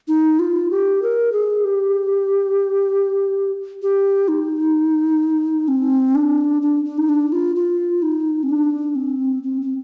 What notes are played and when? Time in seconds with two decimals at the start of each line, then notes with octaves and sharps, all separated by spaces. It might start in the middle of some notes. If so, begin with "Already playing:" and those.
0.08 D#4
0.39 F4
0.71 G4
1.02 A#4
1.32 G#4
1.64 G4
3.82 G4
4.28 D#4
5.68 C4
6.15 D4
6.62 D4
6.85 D4
6.98 D#4
7.09 D4
7.32 F4
7.56 F4
8.02 D#4
8.43 C4
8.49 D4
8.96 C4
9.43 C4
9.62 C4